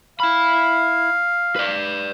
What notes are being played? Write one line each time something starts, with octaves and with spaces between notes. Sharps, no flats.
E4 F5 B5
B4 D5